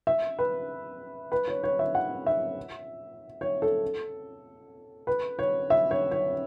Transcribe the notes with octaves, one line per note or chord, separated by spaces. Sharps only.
E5
B4
B4
C#5
C#5
E5
F#5
E5
C#5
A4
B4
C#5
E5
C#5
C#5